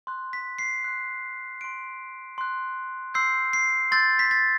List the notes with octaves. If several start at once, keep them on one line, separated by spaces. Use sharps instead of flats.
C6 F#6
B6
C7
C6 F#6
C6 F#6 D7
C6 F#6
C6 E6 G6 C7
C7
C6 E6 G6 A6
B6
A6